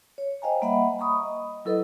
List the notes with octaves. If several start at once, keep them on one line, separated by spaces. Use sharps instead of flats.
C#5
C5 D#5 F5 G5 G#5 A#5
G3 A#3 D#5 E5 F#5 B5
A#5 B5 C#6 D#6
D#5
F#3 E4 A4 B4 D#5